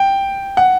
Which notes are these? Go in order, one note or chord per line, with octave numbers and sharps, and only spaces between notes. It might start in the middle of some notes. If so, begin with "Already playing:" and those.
Already playing: G5
F#5